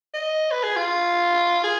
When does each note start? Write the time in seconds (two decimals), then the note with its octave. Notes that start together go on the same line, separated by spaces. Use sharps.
0.14 D#5
0.51 B4
0.63 G#4
0.76 F4
1.64 G#4